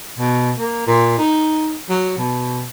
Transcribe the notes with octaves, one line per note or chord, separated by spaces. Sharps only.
B2
A#3
A#2
D#4
F#3
B2